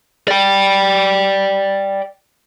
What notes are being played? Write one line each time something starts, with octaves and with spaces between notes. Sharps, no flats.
D5 G5